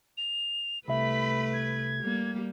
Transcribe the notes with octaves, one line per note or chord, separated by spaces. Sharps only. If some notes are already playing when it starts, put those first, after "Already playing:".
F7
C2 A3 B4 E5 B5
G#6
G3 A#3